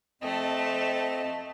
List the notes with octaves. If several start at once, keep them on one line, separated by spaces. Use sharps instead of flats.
F2 A3 C4 D#5 A5